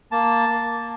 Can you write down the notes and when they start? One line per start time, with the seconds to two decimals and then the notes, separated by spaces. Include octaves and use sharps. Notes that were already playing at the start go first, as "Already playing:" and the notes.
0.12 A#3 A5
0.49 A#3